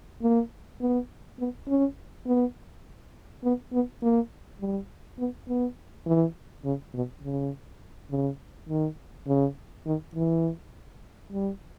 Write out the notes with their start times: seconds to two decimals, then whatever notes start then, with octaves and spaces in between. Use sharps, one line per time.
0.22 A#3
0.81 B3
1.39 B3
1.68 C#4
2.27 B3
3.44 B3
3.73 B3
4.02 A#3
4.60 G3
5.19 B3
5.48 B3
6.06 E3
6.65 C#3
6.94 B2
7.23 C#3
8.11 C#3
8.69 D#3
9.28 C#3
9.86 D#3
10.15 E3
11.32 G3